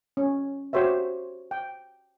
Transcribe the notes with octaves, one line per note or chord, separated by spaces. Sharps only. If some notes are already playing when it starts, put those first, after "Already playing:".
C#4
F#4 G4 C5 C#5 E5
G5